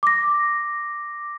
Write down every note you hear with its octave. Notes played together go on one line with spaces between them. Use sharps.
D6 A#6